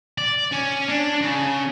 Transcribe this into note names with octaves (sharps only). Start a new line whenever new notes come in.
D5
C#4
D4
C#3